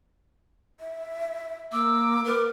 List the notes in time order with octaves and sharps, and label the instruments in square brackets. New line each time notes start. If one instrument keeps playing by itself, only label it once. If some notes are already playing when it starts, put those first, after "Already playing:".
[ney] E5
[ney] A#3 [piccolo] D6 [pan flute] E6
[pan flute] A#4 [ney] B4